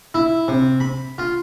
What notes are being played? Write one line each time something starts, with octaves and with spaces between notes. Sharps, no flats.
E4
C3
B5
F4